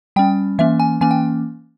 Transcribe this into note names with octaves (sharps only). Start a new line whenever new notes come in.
G3 C#4 G5
E3 A#3 C#4 E5
G#5
E3 A#3 C#4 G#5
G5